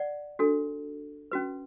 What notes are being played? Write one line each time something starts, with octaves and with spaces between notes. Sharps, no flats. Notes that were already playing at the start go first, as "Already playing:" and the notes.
Already playing: D5 F#5
D4 F#4 A4
C#4 F#4 B4